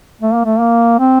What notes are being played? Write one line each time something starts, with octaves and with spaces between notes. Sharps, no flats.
A3
A#3
A3
A#3
C4